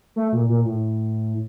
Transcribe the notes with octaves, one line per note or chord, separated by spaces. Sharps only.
A3
A#2
A#2
A2